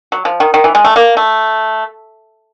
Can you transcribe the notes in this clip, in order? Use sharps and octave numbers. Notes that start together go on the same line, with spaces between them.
F#3
F3
D#3
D#3
E3
G#3
A3
A#3
A3